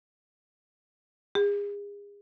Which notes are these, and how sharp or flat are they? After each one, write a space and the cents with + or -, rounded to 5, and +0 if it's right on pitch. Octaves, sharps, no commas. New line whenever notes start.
G#4 -35